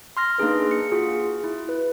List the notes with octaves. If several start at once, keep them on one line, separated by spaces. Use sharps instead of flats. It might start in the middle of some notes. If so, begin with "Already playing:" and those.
C6 F6 A#6
A#3 D4 D#4 G#4 B4
C#7
F4 F#4 G#4
E4
B4